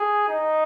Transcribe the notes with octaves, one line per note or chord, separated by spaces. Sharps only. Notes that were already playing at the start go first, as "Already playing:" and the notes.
Already playing: G#4
D#4